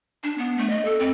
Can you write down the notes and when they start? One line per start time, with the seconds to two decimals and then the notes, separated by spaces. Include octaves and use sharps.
0.24 D4
0.38 B3
0.58 A3
0.70 D#5
0.85 A4
1.00 C4